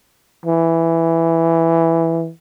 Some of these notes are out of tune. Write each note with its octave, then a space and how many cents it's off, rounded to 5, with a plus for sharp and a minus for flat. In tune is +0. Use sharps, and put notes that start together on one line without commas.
E3 +5